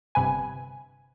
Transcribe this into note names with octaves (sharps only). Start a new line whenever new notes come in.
G1 G2 C3 B4 G#5